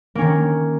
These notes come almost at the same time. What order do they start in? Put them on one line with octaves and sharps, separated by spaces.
A#3 C#4 D#3